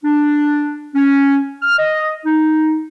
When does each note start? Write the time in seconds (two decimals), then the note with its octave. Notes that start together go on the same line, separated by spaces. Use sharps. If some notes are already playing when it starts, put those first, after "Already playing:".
0.04 D4
0.94 C#4
1.62 F6
1.78 D#5
2.25 D#4